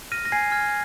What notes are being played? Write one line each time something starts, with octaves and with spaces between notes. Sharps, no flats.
F6 A#6 D#7
A#6
G#5 G#6 C7
F6 G#6